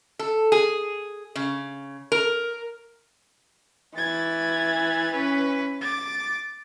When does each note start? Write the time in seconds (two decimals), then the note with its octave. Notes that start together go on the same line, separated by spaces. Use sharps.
0.19 A4
0.52 G#4
1.36 C#3
2.12 A#4
3.96 E3 G#6 A6
5.13 C#4 B4
5.81 D6 A6